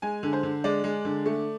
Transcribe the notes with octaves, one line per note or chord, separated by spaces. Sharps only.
G#3 G#5
D3
C5
D3
G#3 D5
G#3
D3
A3